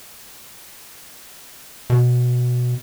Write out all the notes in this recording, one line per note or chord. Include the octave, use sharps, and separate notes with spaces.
B2